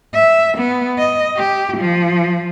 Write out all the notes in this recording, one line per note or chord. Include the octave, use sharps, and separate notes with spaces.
E5
B3
D#5
G4
F3